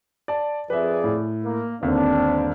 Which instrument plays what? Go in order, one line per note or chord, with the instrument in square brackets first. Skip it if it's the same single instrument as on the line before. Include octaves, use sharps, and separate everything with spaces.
[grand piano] D5 A5
[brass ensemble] F2 G#4 D5 [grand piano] B4 E5
[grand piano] A2
[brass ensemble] A#3
[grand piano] G1 D#2 D3 [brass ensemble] C4 D4